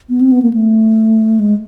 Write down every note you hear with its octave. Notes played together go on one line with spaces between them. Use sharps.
B3
C4
B3
A#3
A3
G#3